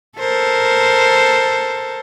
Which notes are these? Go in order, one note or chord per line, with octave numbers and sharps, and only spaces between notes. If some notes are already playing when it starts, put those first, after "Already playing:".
A4 A#4 C5